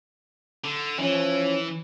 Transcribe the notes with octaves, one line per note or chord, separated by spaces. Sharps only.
D3
E3 F3 C#4